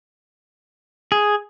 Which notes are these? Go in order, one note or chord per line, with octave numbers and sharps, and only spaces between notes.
G#4